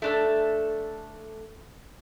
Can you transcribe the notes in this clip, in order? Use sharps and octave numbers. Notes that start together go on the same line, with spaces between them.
A3 D4 A4